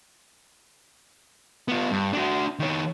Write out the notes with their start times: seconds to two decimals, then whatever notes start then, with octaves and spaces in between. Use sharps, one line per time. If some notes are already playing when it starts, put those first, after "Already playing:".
1.68 B3 F4
1.91 G2
2.13 D4 F#4
2.59 D#3 C#5